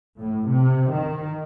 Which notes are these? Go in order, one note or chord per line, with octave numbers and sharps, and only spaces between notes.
A2
C3
D#3